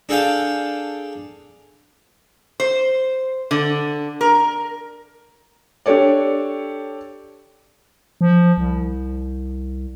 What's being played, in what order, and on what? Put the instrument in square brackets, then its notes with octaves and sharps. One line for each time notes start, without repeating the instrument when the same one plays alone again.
[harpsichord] D4 G#4 A4 F5 G5 A5
[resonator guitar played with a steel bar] C5
D3
A#4
[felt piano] D4 G4 A4 C#5 D5
[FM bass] F3
C2